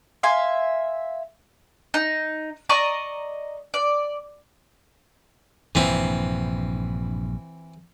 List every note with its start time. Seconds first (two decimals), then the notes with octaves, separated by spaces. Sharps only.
0.23 E5 F5 G#5 C6
1.94 D#4
2.69 D5 D#5 A#5 C#6
3.74 D5
5.75 A#1 G2 C3 E3 C4